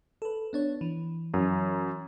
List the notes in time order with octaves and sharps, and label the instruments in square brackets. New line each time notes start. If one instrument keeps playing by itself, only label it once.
[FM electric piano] A4 B4
B3 D4 C#5
E3
[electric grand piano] F#2 [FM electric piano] E3